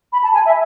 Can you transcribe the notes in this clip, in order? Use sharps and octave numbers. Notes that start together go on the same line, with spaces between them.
B5
A5
G#5
E5